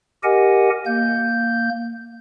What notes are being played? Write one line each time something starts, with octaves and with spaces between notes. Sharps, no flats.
G4 A#4 D#5 F#5 G#5
A#3 G6